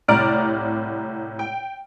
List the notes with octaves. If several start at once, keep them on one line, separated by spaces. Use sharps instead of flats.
C2 A2 D5 A#5 F6 D7
G5